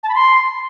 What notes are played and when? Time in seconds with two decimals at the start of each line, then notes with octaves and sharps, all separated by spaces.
0.03 A5
0.09 B5
0.15 C6